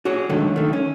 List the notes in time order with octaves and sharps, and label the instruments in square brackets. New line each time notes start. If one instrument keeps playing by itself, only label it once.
[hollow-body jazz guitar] F#4 G#4 C#5
G#2 D3 D#3 F#3 A3
D#3 A3
C#4